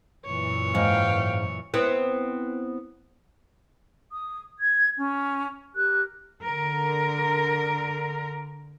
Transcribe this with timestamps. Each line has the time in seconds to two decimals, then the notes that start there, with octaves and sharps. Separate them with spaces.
0.25 F#2 A#2 E3 C#5
0.75 G#2 F5 G5
1.74 B3 C4 E4
4.13 D#6
4.59 G#6
4.97 C#4
5.74 G4 A#4 F#6
6.44 D3 A#4